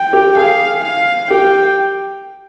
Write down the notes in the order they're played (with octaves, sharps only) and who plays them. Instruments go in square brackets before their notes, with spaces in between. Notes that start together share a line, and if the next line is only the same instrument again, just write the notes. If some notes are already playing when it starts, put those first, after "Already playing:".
Already playing: [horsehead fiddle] G5
[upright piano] G4
[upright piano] G#4 [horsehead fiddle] F5
[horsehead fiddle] F5
[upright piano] G4 [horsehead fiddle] G5